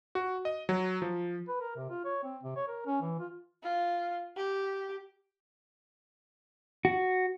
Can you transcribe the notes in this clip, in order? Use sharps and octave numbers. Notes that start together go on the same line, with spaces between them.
F#4
D#5
F#3
F3
B4
A#4
C3
F4
C#5
C4
C3
C#5
A#4
C#4
E3
F4
F4
G4
F#4